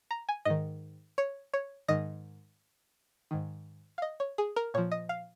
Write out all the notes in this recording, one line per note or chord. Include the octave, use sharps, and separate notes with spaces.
A#5
G#5
G#2 D#3 D#5
C#5
C#5
G#2 D#3 D#5
G#2 D#3
F5
D#5
C#5
G#4
A#4
A#2 F3 C#5
D#5
F5